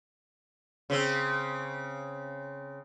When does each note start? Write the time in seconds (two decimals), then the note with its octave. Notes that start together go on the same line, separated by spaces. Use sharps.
0.90 C#3 C4